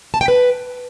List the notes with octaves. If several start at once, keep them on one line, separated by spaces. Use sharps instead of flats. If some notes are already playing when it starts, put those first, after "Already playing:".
A5
G5
B4